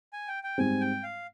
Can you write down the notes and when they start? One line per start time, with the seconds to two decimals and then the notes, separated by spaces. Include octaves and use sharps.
0.13 G#5
0.28 G5
0.43 G5
0.58 G#2 G3 C4 G#5
0.81 G5
1.03 F5